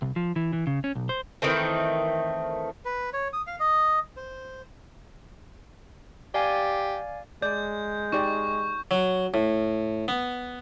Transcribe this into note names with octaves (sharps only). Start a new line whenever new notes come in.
C2
F3
E3
E3
C#3
C#4
B1
C5
D#3 E3 A3 C4
B4
C#5
D#6
F5
D#5
C5
G4 D5 F5 G#5
G#3 D5 G6
D#4 G4 D5 C#6
F#3
A2
B3